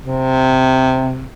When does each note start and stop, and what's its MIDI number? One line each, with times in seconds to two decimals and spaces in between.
0.06 1.27 48